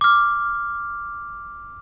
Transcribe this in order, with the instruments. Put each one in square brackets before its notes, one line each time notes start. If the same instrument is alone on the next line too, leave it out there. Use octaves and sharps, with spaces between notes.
[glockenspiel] D6 F6